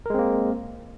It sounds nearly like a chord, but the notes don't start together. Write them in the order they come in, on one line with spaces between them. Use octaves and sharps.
A#4 G#3 C4 A#3